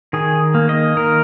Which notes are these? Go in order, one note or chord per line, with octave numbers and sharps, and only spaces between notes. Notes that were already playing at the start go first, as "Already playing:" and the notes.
D#3 G#4
A#3
D#5
D#3 A#4